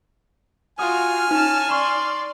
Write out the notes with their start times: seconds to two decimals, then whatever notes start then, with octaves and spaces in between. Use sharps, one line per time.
0.79 F4 F#4 G#5 D#6 F6
1.31 C#4 D#4 A5
1.71 D5 C6 C#6